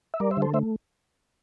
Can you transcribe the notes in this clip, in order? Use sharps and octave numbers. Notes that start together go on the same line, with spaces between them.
E5
G3 A#4 D5
C5 E5
D3
A4 C5
A3 C5 E5